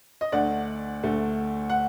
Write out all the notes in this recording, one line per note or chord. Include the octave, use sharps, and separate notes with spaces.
D#5
D2 D3 A3 D5 F#5
D2 D3 A3
F#5